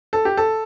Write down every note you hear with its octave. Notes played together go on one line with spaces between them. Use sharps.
A4
G4
A4